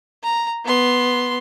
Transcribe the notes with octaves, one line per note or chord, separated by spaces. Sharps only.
A#5
B3 C6